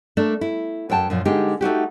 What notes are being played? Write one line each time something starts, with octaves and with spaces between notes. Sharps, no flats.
A3 A#3 D4
E4
F#2 F#4 G5 A5
F#2 A#2 F3
D3 G#3 A#3 D#4 G4
A3 D#4 F#4 G4